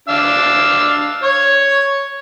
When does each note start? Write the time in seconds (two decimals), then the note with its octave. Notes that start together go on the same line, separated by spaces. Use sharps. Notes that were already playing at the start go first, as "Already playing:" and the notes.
0.09 D4 F5 E6
1.23 C#5 C#6